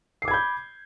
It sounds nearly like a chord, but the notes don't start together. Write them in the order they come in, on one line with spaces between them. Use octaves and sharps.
C7 D6 G#6 B5 G6